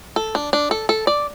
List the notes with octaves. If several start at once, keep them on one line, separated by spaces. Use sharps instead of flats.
A4
D4
D4
A4
A4
D5